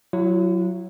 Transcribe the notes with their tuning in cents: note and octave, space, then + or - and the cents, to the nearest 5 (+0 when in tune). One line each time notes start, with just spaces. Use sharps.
F#3 +0 E4 +45